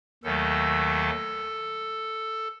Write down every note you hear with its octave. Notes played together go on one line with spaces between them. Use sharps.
D#2 D#3 F#3 A3 A4